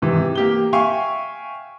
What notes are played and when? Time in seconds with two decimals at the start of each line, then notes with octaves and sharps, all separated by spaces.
0.02 G#2 C3 E3
0.35 A#3 G4 G7
0.73 E5 F5 G5 G#5 C#6